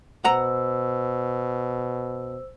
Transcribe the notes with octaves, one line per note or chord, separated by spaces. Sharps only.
B2 C5 F#5 A#5 E6